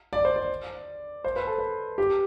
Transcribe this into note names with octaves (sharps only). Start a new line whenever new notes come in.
D5
C5
D5
C5
B4
A4
B4
G4